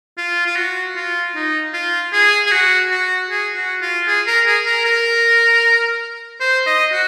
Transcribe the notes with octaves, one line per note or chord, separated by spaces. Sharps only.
F4
F4
F#4
F4
D#4
F4
G#4
G#4
F#4
F#4
G#4
F#4
F4
G#4
A#4
G#4
A#4
A#4
C5
D#5
F#4